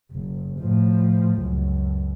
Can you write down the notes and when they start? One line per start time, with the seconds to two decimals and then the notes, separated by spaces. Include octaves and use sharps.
0.12 F#1
0.59 A2 F3
1.39 C#2 F#2